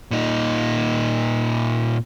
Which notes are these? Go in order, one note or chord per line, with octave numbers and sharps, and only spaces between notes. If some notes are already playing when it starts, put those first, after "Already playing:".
A#2 D#4